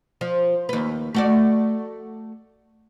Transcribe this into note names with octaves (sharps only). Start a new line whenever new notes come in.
F3
D#2 B4
A3 F#4 D5